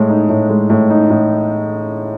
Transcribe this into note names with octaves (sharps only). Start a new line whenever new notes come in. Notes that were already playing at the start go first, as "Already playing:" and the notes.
Already playing: A2 G#3
D#4
A2
G#3
A2
D#4
A2